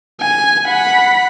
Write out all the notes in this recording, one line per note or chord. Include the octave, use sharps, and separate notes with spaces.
G#5
F#5 B5